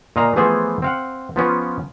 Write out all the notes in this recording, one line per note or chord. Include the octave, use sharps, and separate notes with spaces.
A#2 D#5 F5 A#5
E3 F3 A3 B3 G#4 C5
C4 F5 F#5
F3 B3 C#4 F4